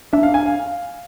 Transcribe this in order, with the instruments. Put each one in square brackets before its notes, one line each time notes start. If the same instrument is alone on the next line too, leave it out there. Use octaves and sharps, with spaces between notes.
[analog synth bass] D4 [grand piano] E5
[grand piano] F5
G#5
F5